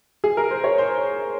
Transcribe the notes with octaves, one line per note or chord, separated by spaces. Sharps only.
G#4
A#4
C5
C#5
C5